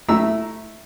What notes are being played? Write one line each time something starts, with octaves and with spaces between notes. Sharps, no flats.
A3 E4 A#5 E6